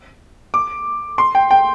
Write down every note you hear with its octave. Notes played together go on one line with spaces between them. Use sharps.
D6
C6
G5
G5